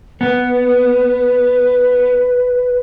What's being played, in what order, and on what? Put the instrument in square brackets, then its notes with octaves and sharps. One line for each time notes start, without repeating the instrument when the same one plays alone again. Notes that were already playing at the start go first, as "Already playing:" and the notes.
[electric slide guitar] B3 [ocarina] B4